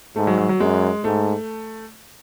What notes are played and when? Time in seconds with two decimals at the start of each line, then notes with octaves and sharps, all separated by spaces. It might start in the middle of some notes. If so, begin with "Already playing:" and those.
0.16 G#2 A3
0.27 F#3
0.38 F#3
0.49 F#3
0.60 F#2 G#3
1.04 G#2 A3